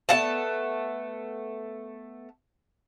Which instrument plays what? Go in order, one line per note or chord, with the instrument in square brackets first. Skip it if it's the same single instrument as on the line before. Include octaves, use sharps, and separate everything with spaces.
[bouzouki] A3 B3 F#5 A5